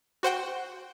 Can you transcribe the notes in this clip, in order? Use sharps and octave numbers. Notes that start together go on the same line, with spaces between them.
F#4 C5 F#5 G5